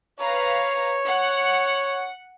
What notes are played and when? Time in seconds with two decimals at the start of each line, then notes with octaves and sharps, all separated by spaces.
0.20 B4 C#5 F5 A#5
1.07 F#5